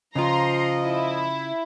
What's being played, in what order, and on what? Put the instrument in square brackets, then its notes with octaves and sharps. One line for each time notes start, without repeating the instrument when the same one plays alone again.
[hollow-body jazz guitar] C#3 F4 [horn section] F3 D#5 [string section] A#5 C6
[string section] E4